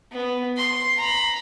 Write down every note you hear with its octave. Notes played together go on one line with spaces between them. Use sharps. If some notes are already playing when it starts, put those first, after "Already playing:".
B3
C6
A#5 B5